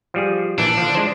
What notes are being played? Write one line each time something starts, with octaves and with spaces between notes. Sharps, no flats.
F3 G3 G#4
A#1 E3 D4
D3 F3
G#3 D4 C5